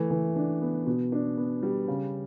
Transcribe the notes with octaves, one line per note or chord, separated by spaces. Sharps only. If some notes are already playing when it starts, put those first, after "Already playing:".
Already playing: E3 A3
E3
D4
B3
B2
D4
B3
G3
C#3